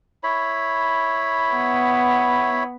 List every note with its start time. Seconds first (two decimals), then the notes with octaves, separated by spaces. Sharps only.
0.23 E4 C#5 B5
1.53 B3